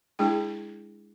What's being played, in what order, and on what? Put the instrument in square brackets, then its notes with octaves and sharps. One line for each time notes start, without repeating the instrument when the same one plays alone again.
[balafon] G#3 D4 E4 G#4 G5